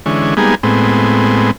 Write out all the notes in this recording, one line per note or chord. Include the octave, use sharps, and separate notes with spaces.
D3 E3 G#3 C#4
G3 G#3 A#3 B3 D#4 G#4
A2 G#3 B3 C4